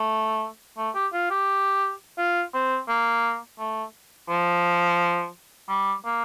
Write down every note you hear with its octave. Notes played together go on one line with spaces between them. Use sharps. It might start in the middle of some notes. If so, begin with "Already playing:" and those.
Already playing: A3
A3
G4
F4
G4
F4
C4
A#3
A3
F3
G3
A#3